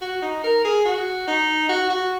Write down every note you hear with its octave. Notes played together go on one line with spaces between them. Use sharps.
F#4
D#4
A#4
G#4
F#4
D#4
F#4
F#4